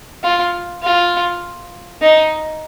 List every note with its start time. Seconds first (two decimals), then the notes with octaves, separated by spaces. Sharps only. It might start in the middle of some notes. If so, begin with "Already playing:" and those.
0.24 F4
0.84 F4
2.02 D#4